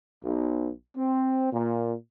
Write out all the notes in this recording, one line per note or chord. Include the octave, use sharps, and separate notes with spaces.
B1
C4
A#2